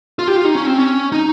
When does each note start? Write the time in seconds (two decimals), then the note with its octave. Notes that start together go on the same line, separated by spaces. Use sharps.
0.19 F4
0.28 G4
0.36 F4
0.45 D#4
0.55 C#4
0.67 C4
0.78 C#4
1.12 D#4